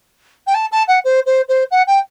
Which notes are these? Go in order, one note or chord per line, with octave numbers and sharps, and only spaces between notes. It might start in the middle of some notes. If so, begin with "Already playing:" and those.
G5
A5
A5
F#5
C5
C5
C5
F#5
G5